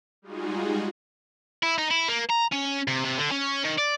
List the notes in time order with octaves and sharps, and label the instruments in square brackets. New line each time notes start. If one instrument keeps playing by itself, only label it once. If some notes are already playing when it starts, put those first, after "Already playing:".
[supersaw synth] G3 G#3 D#4 F4 F#4 G#4
[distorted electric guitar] E4
D#4
E4
A#3
A#5
C#4
C3
C3
D3
C#4
D#3
D5